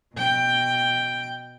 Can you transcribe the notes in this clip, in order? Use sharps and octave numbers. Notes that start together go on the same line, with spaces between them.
B2 G5